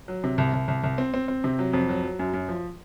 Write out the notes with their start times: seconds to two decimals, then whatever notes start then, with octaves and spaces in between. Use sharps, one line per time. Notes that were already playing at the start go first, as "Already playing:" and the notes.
0.08 F#3
0.24 C3
0.38 C2
0.53 C2
0.68 C2
0.84 C2
0.98 C4
1.14 C4
1.28 C4
1.44 C3
1.59 F#3
1.73 F2
1.89 F#3
2.03 F#3
2.19 F#2
2.33 F#2
2.49 F3